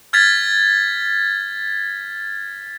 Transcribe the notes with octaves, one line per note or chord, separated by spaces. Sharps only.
F6 G#6 A6 B6